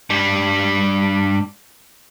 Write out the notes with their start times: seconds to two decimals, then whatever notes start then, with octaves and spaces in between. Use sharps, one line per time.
0.10 G2 G3